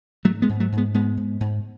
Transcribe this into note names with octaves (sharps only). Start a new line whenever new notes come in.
G#2 F#3 A3
G#3 B3
G#2
F#3 A3
G#2
G#3 B3
G#2 G#3 B3
G#2
G#2